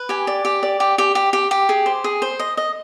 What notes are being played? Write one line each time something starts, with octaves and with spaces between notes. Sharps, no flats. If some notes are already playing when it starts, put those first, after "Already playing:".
Already playing: B4
G4 G#5
D5
G4
D5
G4
G4
G4
G4
G4
G#4
C5
G#4
C5
D#5
D#5